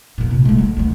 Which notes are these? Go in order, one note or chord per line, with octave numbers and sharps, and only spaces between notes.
E2 A#2
C3 F4
G#3 A3
F#3
D2 E3